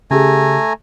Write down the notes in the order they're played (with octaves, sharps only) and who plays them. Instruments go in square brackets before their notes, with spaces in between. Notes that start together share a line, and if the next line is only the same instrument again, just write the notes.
[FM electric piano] C#3 G4 G#4 [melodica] A3 G#5 A#5